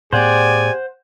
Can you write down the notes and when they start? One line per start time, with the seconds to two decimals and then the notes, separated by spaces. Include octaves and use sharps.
0.13 A2 B3 G4 G#4 C5 D5 F#5 G#5